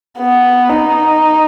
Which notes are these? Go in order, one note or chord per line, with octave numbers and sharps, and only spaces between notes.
B3
D#4